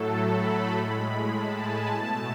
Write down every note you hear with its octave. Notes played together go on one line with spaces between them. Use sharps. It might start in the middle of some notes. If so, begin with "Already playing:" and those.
Already playing: A2 F#3 A3 A4
B5
A2 G#3 B5
A5
G#5
B2 A3 A5